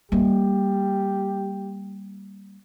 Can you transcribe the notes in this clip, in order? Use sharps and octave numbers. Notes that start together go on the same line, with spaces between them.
G3 A#3 G4